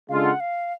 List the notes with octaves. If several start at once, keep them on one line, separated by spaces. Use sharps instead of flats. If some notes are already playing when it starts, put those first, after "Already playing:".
C#3 G#3 D4 F4 A4 F5
F#5
F5